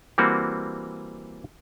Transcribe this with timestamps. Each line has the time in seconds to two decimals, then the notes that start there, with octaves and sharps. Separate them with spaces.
0.18 E3 G3 A#3 C4 F#4